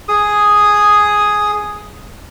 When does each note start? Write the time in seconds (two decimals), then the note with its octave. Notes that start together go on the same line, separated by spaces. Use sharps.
0.08 G#4 D#6